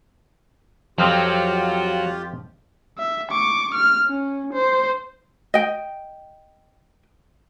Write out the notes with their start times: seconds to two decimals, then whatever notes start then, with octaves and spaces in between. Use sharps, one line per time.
0.98 F2 F3 F#3 C4 F4 G4
2.98 E5
3.31 C#6 D6
3.75 F6
4.06 C#4
4.53 C5
5.54 D#5 G5